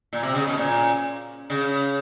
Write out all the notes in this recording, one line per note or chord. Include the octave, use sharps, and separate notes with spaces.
A#2
C3
C#3
B2
A#2
C#3